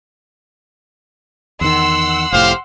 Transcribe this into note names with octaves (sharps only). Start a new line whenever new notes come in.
E2 D#3 F#5 C6 E6
F1 A2 G4 C5 F5